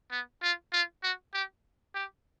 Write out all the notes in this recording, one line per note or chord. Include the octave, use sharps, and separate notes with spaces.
B3
F4
F4
F#4
G4
G4